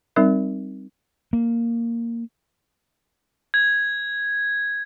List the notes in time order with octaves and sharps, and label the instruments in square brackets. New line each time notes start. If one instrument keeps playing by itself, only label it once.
[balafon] G3 C4 D#4 A#4 E5
[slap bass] A#3
[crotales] G#6